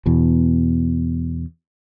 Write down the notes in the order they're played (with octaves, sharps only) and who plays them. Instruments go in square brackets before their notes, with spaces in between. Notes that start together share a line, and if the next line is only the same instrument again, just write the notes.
[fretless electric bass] E2 B2